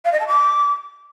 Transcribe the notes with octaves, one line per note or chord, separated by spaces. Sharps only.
F5
D#5
A5
D6